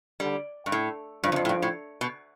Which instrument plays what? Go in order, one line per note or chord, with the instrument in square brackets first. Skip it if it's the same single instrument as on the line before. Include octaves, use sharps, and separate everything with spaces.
[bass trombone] D3 [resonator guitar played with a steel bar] G3
[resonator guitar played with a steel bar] G2
A2
[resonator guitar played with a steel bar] G2 [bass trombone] F3
[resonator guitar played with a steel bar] E2
F2
A2
G2
A2
B2